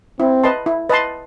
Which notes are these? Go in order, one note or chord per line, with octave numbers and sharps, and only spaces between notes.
C4 E4
B4 D#5 A5 C6
E4
B4 D#5 A5 C6